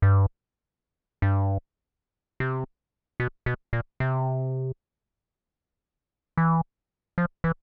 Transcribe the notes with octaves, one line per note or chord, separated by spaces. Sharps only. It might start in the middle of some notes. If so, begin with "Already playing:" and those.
G2
G2
C3
B2
B2
A#2
C3
E3
F3
E3